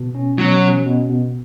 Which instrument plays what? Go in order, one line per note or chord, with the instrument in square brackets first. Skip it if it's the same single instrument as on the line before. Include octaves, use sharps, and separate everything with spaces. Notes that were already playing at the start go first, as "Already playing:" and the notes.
Already playing: [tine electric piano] B2
C#4
[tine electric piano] B2 [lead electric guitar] F#3
[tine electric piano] C#4
B2
B2